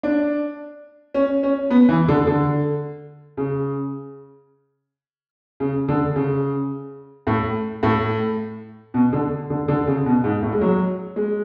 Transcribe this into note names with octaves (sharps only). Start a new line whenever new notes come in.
D4
C#4
C#4
B3
E3
D3
D3
C#3
C#3
D3
C#3
A2
A2
B2
D3
D3
D3
C#3
B2
G#2
A2
G#3
F#3
G#3